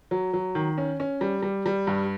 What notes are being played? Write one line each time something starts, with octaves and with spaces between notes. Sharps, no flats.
F#3
F#3
D#3
C#4
C#4
G3
G3
G3
G2